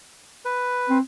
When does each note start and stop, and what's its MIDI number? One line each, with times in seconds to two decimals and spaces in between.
0.45 0.98 71
0.89 1.00 60